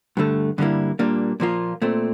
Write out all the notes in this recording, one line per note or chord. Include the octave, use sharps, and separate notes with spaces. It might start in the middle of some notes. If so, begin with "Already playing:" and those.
G2 D3 A3
G2 D3 G3 A#3 E4
A#2 G3 A#3 D4
A#2 F3 A#3 F4
A#2 A3 C4